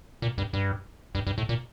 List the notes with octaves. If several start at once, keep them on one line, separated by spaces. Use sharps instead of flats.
A#2
G2
G2
G2
G2
A2
A#2